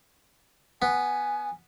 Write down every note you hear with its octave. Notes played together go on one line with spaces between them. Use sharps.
B3 G#5